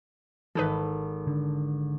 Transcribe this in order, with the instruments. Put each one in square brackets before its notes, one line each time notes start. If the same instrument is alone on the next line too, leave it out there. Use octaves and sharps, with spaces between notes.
[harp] G#1 A4 [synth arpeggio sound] E3 D#4 B4
[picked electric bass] D3